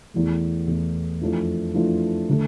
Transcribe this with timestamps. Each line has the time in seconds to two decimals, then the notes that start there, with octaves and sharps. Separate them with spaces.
0.14 E2 E3 A3
0.67 E2 E3 A3
1.21 F2 E3 A3 D4 F4
1.74 F2 E3 A3 D4 F4
2.29 D3 A3